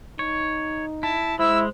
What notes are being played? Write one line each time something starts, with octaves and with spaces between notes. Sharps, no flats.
D#4 C#5
E4 A5
G#3 E4 C5 E6